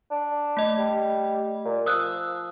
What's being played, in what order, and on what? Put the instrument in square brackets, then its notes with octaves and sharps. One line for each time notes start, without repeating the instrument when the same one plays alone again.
[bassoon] D4
[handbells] A3 D#5
[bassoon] G3
A#2
[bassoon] F3 [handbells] D#6 E6 F#6